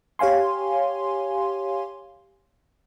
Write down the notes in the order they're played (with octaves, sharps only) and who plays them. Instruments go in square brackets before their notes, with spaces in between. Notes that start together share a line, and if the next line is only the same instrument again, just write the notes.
[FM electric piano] G4 C#5 F5 G#5 C6